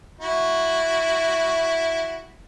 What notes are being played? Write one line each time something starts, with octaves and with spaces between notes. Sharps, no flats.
E4 F#4